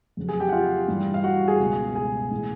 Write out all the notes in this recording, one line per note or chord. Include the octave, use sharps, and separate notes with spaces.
F2 C#3 F#3
G#4 G#5
G4 G5
F#5
F4 F5
G2 E3 G3
F5
F#4 F#5
G#4 G#5
C#2 B2 G#3
G#4 G#5
A2 E3 G#3